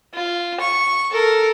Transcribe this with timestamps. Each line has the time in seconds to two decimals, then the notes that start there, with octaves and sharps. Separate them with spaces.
0.14 F4
0.60 C#6
1.11 A4 A#4